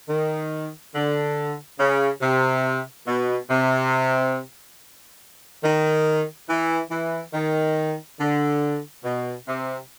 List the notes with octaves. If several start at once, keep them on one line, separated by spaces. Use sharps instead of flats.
D#3
D3
C#3
C3
B2
C3
D#3
E3
E3
D#3
D3
B2
C3